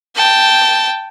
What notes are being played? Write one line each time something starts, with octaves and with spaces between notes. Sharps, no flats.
G5 A5